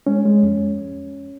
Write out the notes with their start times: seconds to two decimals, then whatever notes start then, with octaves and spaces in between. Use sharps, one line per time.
0.07 G#3 C#4
0.25 G#3
0.43 F2
0.60 F2